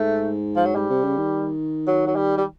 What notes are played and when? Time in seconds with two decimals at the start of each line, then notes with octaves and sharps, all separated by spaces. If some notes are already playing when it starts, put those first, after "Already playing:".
Already playing: G#2 A3
0.56 F3
0.65 F#3
0.75 G#2 G3
0.90 C3
1.04 C#3
1.18 D#3
1.87 F#3
2.07 F#3
2.16 G3
2.38 G3